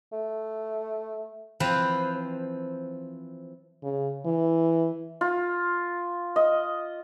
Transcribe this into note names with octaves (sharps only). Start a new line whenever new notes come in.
A3
E3 F3 C4 B4 C5
C#3
E3
F4
D#5